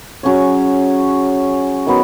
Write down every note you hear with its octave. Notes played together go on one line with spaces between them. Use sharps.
F#3 C#4 G#4 C#5
D#3 F#3 B3